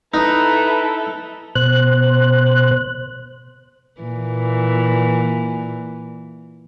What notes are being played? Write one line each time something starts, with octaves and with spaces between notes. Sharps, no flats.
D#4 E4 A4 B4 A#5
B2 C5 F#6
A#2 E3